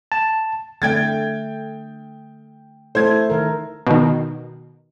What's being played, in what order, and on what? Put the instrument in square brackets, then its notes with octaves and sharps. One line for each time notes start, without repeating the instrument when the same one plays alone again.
[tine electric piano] A5
[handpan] D3 A3 [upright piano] G5 G#6 A6
[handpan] A3 E4 A4 [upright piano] C5 G#6
[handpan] D#3 A#4
[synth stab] B2 D#3